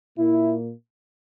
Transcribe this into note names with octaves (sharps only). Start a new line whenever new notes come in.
A#2 A#3 E4